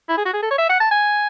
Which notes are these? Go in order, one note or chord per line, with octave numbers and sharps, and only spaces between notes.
E4
G#4
F#4
G#4
A4
C#5
E5
F#5
A5
G#5